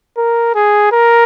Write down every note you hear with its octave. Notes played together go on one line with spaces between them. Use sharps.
A#4
G#4
A#4